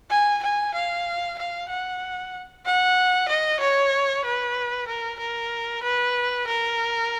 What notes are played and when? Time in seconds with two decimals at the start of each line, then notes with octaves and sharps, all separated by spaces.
0.10 G#5
0.43 G#5
0.74 F5
1.38 F5
1.69 F#5
2.66 F#5
3.28 D#5
3.60 C#5
4.25 B4
4.88 A#4
5.19 A#4
5.83 B4
6.47 A#4